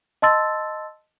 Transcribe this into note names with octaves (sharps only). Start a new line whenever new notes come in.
D#5 A5 C6 E6 A6